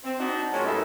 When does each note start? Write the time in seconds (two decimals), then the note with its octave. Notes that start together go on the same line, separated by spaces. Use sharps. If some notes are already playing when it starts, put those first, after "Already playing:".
0.04 C4
0.19 D4 D#4 F#4
0.53 A#2 F#3 G#3 C#4
0.66 F#2 G3 B3 D#4 A4 E5